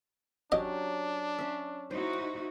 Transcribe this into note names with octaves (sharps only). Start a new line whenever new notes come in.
F#3 C#4 D4 G4 D#5
C#4 E5
D#4 E4 F#4 C5